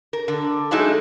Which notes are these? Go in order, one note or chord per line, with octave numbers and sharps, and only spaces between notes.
A#4
D3
F#3 G#3 A3 D#4 E4